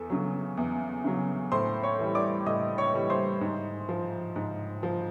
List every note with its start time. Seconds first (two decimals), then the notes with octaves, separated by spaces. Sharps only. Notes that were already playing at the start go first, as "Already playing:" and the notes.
Already playing: E2 A4
0.10 C#3 F#3
0.57 E2
1.04 C#3 F#3
1.52 A2 C5 C6
1.83 C#5 C#6
1.99 E3 G3
2.15 D5 D6
2.46 A2 D#5 D#6
2.78 C#5 C#6
2.94 E3 G3
3.10 C5 C6
3.41 G#2
3.89 F3
4.36 G#2
4.83 F3